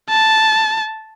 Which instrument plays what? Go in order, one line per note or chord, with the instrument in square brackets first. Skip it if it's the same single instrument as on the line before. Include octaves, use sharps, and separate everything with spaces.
[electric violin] A5